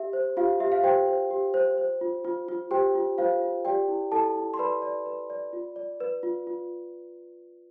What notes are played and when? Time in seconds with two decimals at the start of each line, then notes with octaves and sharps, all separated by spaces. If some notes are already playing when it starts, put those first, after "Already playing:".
Already playing: G4 E5
0.13 C5
0.37 F4 G4 F5
0.60 G4 E5
0.72 F5
0.83 G4 C5 G5
1.07 C5
1.31 G4
1.54 C5
1.78 C5
2.01 F4
2.25 F4
2.49 F4
2.71 G4 C5 G5
2.95 F4
3.18 F4 C5 F5
3.41 F4
3.65 G4 D5 G5
3.88 E4
4.12 E4 A4 A5
4.36 E4
4.54 C6
4.59 B4 D5 B5
4.82 D5
5.06 B4
5.30 D5
5.53 F4
5.76 D5
6.00 B4
6.23 F4
6.47 F4